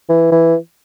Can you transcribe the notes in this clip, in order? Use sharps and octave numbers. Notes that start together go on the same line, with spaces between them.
E3
E3